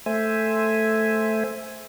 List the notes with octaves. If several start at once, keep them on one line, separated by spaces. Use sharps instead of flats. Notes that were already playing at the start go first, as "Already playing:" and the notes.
A3 C5 E5 G#5